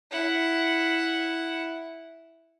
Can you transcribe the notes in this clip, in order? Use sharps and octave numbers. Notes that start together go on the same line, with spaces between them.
E4 F#5